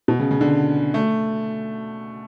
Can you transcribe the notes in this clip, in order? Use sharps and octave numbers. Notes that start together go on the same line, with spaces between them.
B2
C#3
C#3
D3
A3